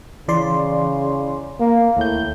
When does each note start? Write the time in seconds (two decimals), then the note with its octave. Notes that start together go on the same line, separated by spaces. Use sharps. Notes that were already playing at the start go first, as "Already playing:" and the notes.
0.28 C#3 E3 D5 C6
1.60 A#3
1.97 D#2 A2 G6